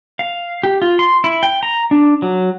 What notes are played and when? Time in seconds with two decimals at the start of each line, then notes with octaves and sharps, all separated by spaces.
0.19 F5
0.63 G4
0.82 F4
0.99 C6
1.24 E4
1.43 G5
1.63 A#5
1.91 D4
2.22 F#3